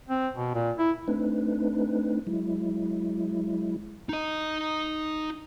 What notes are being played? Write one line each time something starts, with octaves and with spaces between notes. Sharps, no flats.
C4
B2
A#2
E4
A3 C4 D4 D#4 B4
F#3 G#3 E4
D#4 D#5